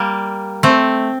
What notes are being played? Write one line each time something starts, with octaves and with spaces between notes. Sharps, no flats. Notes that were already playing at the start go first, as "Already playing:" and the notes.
Already playing: G3 A#3
A3 C4